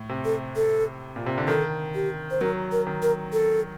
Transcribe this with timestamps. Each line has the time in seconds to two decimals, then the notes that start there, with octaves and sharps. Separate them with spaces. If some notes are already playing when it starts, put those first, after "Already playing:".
Already playing: A2
0.09 C3
0.25 A4
0.56 A4
1.16 A#2
1.26 C3
1.38 D3
1.48 D#3 A4
1.95 G4
2.31 C5
2.41 F#3 A#4
2.72 A#4
2.87 D#3
3.03 A#4
3.33 A4